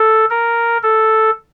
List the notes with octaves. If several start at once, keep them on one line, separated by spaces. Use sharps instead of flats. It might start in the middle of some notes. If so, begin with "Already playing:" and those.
Already playing: A4
A#4
A4